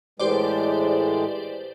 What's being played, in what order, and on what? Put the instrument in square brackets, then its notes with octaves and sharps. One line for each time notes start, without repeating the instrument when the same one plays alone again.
[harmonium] A2 E3 G#3 [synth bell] G4 C5 D5